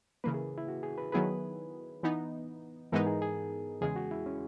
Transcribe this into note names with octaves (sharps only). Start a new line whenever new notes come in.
C#3 E3 A#3 B4
G#4
E4
F#4
G#4
B4
D#3 F#3 B3 E4 G#4 B4
E3 B3 D#4
G#2 E3 G#3 B3 D#4 A#4
G#4
G#4
E2 C#3 G#3 G#4
F#4
E4
C#4